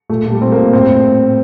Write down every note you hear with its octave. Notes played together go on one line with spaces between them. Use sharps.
A#2 A3
A#2
G3
A#2 C4
A#3
A#2
A2 C4
A2